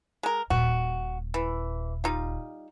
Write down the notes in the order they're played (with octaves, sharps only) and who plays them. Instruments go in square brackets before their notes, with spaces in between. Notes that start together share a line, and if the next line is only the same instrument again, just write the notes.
[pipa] G#3 A#4
[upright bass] D#1 A#2 [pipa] F#4
[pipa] E3
G3 D#4 F4